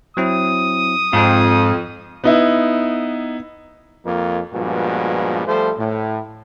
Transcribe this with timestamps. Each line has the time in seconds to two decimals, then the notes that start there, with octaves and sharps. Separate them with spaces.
0.17 F#3 C4 E4 D#6
1.13 F2 G#2 C4 F4
2.24 B3 D#4 E4
4.05 F2 F3 A#3
4.53 G2 A#2 F3 G#3 B3 F#4
5.47 F3 G3 A3 A4 C5
5.78 A2